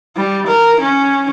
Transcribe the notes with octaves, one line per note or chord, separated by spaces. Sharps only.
G3
A#4
C#4